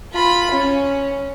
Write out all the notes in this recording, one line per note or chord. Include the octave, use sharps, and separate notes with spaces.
F4 B5
C#4